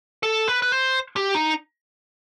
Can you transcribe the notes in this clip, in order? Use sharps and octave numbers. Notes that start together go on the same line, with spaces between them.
A4
B4
B4
C5
G4
D#4